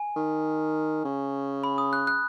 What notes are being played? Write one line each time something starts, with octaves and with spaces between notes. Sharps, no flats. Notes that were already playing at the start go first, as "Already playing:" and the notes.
Already playing: G#5
D#3
C#3
B5
D#6
F#6
F#6